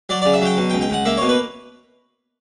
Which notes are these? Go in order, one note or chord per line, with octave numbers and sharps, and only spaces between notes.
F#3 D5
C#3 D5
E5
F#3 G5
B2
G5
C#2
G5
C#2 F#5
A#3 E5
B2 C#5
B4